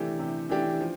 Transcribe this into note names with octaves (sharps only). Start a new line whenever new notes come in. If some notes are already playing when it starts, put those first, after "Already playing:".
Already playing: C3 E3 A3 D4 G4
C3
E3 A3 D4 G4
F3